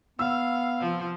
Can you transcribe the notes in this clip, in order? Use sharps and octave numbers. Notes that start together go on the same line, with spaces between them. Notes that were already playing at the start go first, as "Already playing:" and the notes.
B3 F5 E6
C3 F3 C5